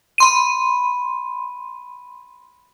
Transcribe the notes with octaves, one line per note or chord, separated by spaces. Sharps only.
B5 C6 D#7